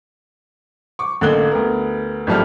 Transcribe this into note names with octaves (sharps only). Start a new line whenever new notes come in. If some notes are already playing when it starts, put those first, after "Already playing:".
C#6 D6
A1 D3 A#3 F#6 G7
D2 B3 A#4
G#1 A2 F3 G3 A5 F6